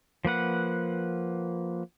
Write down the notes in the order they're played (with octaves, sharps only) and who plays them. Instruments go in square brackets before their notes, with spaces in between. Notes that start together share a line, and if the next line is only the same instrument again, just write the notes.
[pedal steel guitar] F3 A#3 B4 F#5